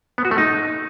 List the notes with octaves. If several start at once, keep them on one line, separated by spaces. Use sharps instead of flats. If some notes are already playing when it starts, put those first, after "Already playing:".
B3
F#4
A3
D#4